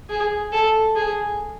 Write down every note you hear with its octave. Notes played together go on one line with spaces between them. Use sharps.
G#4
A4
G#4